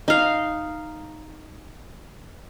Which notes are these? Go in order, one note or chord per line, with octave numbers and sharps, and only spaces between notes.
D#4 F5